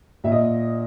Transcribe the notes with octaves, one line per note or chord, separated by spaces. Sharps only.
A#2 E5
D#5